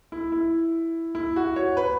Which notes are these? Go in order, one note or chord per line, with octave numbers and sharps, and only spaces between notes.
E4
E4
E4
F#4
C#5
B4